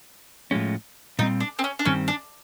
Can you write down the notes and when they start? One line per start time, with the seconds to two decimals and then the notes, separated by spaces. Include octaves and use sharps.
0.51 A2 F3 G#3 C#4
1.19 A#2 G3 C4 D#4
1.40 D4
1.59 C4
1.64 C#4
1.79 D4
1.85 G2 D#3 G3 C4 C#4
2.08 D4